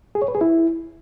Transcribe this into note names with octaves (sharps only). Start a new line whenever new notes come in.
G#4
C#5
B4
G#4
E4